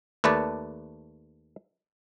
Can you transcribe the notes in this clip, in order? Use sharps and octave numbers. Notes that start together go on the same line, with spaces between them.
D#2 A3 B4 D5 A5